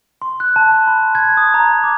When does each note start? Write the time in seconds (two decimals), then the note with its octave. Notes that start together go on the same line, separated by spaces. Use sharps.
0.22 C6
0.40 F#6
0.56 A5
0.72 C6
0.87 B5
1.15 G#6
1.37 D#6
1.54 A#5
1.83 D6